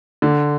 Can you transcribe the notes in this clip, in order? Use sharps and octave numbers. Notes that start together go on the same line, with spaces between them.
D3